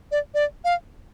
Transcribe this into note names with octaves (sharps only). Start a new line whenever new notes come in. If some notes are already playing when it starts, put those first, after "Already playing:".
D5
D5
F5